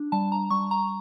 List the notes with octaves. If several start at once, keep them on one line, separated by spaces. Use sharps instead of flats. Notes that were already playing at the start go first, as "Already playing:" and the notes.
Already playing: D4
G3 A5
A#5
G3 C#6
A#5